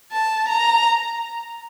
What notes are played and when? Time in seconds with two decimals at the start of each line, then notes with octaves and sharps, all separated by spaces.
0.12 A5
0.48 A#5